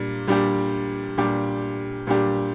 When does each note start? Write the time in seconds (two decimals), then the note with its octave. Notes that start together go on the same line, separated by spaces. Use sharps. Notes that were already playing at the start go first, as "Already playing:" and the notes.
Already playing: A#2 G3 D4
0.28 A#2 G3 D4 G4
1.18 A#2 G3 D4 G4
2.07 A#2 G3 D4 G4